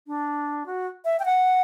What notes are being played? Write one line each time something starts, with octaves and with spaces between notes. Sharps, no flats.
D4
F#4
E5
G5
F#5